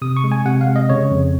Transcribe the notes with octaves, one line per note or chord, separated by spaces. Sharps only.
C3 D#6
C#6
G#3
G#5
C3 F#5
F5
G#3
D#5
C#3 C#5
F2